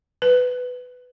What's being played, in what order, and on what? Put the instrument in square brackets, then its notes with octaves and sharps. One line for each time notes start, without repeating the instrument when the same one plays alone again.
[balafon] B4